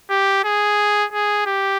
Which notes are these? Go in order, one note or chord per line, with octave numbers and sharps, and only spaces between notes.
G4
G#4
G#4
G4